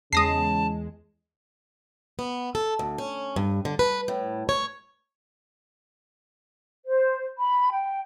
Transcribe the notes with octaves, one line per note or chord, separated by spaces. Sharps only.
E2 C#3 G#3 A5 D#6 A#6 C7
B3
A4
D2
C#4
G2
D3
B4
A2
C#5
C5
B5
G5